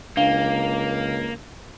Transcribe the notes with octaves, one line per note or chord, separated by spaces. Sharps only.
C#2 A#3 D4 F5 G7